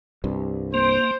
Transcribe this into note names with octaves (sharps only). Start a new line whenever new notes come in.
C2 G2
A#3 C5